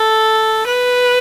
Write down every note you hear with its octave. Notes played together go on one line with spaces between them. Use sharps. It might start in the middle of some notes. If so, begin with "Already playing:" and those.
Already playing: A4
B4